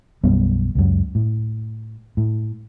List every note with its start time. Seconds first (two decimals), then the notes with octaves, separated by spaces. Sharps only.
0.24 B1 F#2 G3 B3
0.75 C#2 F#2
1.15 A2
2.17 A2